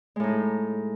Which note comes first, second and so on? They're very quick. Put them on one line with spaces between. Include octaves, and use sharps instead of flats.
G#3 A2 D#4